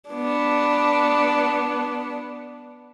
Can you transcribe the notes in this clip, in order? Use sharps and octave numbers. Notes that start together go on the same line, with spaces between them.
B3 D4